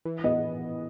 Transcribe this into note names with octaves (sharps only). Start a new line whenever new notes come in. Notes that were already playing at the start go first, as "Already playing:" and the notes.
E3
B3 D#5